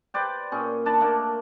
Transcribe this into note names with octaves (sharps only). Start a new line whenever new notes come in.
B4 C5 D5 G5
A#2 C#4 G#4
D4 A5 B5
A3 A#3 D4